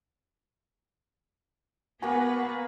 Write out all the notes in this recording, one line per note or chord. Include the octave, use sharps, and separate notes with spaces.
A#3 B3 F#4 G#4 B4 F#5 G#5